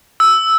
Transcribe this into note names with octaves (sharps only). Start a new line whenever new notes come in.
E6